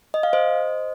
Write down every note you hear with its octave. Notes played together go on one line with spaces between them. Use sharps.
D#5
F5
C5 D#5